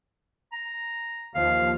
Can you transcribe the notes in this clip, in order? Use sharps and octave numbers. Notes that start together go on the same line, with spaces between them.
A#5
D#2 F3 F5